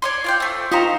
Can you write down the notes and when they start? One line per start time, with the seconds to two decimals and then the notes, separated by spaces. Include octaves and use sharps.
0.02 C#5 D5 C6
0.24 F4 D5 G5
0.40 A3 C4
0.72 D#4 F4 G4 C5 A#5